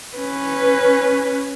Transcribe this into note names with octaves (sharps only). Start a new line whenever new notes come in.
C#4 B4